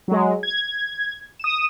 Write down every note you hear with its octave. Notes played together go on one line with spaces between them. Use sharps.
F#3 G#3
G#6
D#6 E7